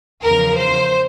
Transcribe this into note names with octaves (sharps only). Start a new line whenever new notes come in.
E2 C#3 F3 A#4
C5